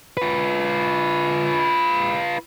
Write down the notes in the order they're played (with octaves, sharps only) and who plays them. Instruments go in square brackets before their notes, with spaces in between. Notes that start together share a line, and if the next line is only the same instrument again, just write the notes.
[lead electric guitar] F4 B4